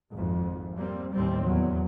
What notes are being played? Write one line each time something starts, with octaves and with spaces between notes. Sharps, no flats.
G#1 F2
G3 A#3 C4
D#2 A2 G3 C4
E2 F#3